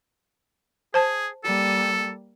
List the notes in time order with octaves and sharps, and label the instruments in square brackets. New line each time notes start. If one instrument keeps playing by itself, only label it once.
[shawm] G#4 [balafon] C5 A5
[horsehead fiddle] G3 A#3 [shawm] A4